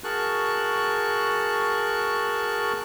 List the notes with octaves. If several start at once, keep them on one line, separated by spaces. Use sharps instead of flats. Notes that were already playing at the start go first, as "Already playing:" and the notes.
F#4 G#4 A#4 A5 C#6 F#6